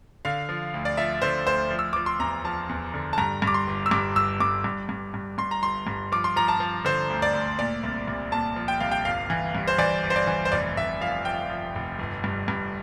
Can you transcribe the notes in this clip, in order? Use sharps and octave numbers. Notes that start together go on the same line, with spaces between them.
D3 F5
F3
D2
D5
F3 E5
D3 C5
D2 C5
F3
E6
F3 D6
C6
E2 A#5
F3 A5
E2
D3
A5
G2 A#5
G2
D6
C6
G1
E6
G2 D6
G1 E6
G2 D6
G2
G2
G2
G2 C6
A#5
G1 C6
G2
F3 D6
C6
F3 A#5
A5
F3
D3 C5
D2
D5
D2
A#2 D5
C2
C2
A#2 A5
F3
G5
C2 F5
G5
G1 F5
E3
G2
C5
E3 D5
G1
C5
D5
E3
C5
F1 D5
F1 E5
F3 F5
F3 G5
F3
F1
G1
G2
G2